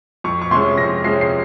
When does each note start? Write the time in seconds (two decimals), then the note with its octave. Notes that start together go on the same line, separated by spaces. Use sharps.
0.24 F2 C#6
0.42 C#6
0.51 C3 F3 G#3 C#4 C6
0.78 F2 A#6
1.04 C3 F3 G#3 C#4 C7
1.21 C7